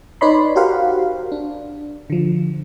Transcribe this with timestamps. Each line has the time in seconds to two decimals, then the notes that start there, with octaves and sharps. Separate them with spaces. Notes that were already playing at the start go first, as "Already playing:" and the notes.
0.21 D#4 B4 C#5 D5 B5 C6
0.56 F#4 G4 A#4 C5 F5 F#5
1.32 D4
2.10 D3 F3